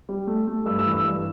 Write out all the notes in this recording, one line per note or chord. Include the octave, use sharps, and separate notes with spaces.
G3
A3
A3
G2 E6
E6
E3
E6
G2